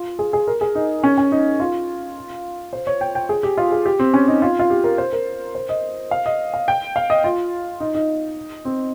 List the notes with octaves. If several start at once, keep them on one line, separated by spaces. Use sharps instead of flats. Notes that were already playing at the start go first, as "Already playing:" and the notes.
Already playing: F4
G#4
G#4
A#4
G#4
D#4
C#4
C#4
D#4
F4
C5
C#5
G5
G5
G#4
G4
F4
G#4
G4
C4
C#4
D#4
F4
F4
G4
A#4
C5
A#4
C5
D#5
F5
D#5
F5
G5
F5
D#5
F4
D#4
D#4
C4